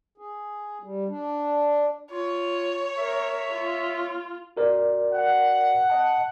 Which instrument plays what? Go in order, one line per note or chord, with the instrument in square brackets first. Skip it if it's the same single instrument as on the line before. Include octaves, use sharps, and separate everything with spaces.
[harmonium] G#4
G3
D4
[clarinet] F4 [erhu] C#5
[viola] A#4 [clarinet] E5
[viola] F4
[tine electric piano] F#4 A#4 D5
[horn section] F#5
[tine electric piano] D#5 A5